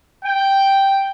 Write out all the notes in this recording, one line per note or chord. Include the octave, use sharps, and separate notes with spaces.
G5